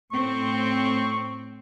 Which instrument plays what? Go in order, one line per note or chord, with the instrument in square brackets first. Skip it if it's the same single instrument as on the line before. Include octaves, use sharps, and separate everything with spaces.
[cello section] A2 C4 [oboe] C#6